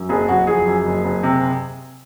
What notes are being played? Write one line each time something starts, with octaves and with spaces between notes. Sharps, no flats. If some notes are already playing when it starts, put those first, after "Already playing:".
Already playing: F#2
F#1 G#4
F#1 F#4
F3 G#4
F#2
F#1
F#1
C3